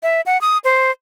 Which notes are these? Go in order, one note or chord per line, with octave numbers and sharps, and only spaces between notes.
E5
F#5
D#6
C5